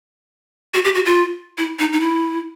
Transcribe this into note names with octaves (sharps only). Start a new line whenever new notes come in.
F#4
G4
F#4
F4
E4
D#4
D#4
E4